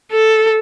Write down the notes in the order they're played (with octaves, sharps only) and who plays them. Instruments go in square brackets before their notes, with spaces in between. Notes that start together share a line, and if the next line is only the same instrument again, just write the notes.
[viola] A4